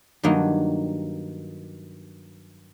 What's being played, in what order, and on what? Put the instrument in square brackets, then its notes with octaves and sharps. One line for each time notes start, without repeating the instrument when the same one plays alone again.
[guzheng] G2 D#3 F#3 A#3 D#4